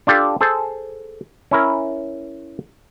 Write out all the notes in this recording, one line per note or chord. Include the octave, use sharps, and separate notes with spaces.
D4 F4 G4 A4
G#4 A4 C5
C#4 E4 A#4